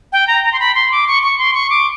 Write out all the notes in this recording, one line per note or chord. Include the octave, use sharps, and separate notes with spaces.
G5
A#5
A#5
C6
B5
C6
D6
C#6
C#6
C6
C#6
D6